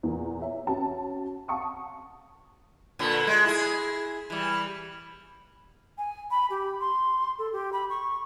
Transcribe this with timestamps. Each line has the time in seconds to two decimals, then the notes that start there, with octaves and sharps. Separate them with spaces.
0.03 E2 A#2 A#3
0.41 C#5 E5
0.67 C#4 F#4 A5
1.48 F5 F#5 A5 C#6 D#6
2.99 A#2 D3 B3
3.27 G#3
3.45 E4 G#4
4.30 E3 G3
5.98 G#5
6.31 B5
6.50 G4
6.80 C6
7.39 A4
7.52 G4
7.73 B5
7.90 C#6